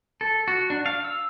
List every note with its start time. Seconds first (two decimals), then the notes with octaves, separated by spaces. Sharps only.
0.21 A4
0.48 F#4
0.70 D4
0.86 F5
1.04 E6